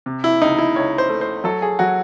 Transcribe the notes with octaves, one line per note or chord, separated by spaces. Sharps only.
C3
E4
C#2 D#4
E4
C#2 C#5
C5
A3
C5
F#3 A4
G#4
F#3 F#4